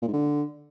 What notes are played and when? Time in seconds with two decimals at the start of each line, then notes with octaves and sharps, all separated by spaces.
0.02 A#2
0.08 G#2
0.13 D3